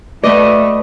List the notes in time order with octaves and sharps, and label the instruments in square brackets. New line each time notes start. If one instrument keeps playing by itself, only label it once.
[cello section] A3 [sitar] F#4 B4 D#5 [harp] D5